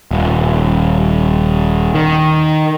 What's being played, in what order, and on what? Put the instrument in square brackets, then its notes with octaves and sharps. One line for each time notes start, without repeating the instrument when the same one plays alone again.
[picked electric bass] D#1
D#3